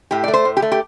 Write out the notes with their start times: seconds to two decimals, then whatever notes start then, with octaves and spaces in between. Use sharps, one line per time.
0.11 A2 G4
0.24 A3 D5
0.34 C5
0.45 A2
0.57 G4
0.62 A3
0.72 G4